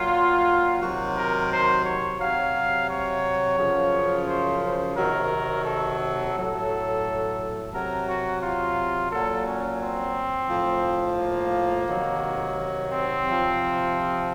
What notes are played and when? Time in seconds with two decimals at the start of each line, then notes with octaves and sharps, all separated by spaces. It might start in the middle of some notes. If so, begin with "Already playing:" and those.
Already playing: A#2 F#3 F4
0.81 C3 D#3 F#3 F#4
1.15 A#4
1.50 C5
1.85 C#5
2.19 C3 F#3 F5
2.88 C#5
3.57 F#2 C#3 F3
4.27 C5
4.61 C5
4.95 C3 D#3 F#3 A#4
5.64 A4
5.99 A4
6.34 A2 F#3
7.72 C3 F#3 A#4
8.07 F#4
8.41 F4
9.10 A#2 F#3 A4
9.45 C#4
9.80 C4
10.49 A2 F3
11.18 A#3
11.86 C3 D#3 F#3
12.90 C4
13.25 C3 F3